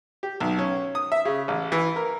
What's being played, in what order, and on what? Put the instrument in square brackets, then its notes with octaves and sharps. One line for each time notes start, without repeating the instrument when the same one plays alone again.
[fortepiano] G4
B1
C#4
D#6
E5
C#3
A1
E3
A#4